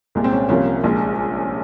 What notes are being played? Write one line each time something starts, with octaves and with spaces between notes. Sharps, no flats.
C2 A#2 G#3
C4
C#4
C2 C3 F3 A#3 C#4
A#1 A#2 G#3